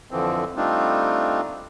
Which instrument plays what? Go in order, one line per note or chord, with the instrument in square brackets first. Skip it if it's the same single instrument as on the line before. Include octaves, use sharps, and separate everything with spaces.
[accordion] F2 D3 E3 F3 C4
G3 A3 C4 D4 D#4 F4